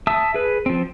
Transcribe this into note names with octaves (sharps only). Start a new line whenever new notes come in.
E5 A5 D#6 E6
G#4 B4
F3 C4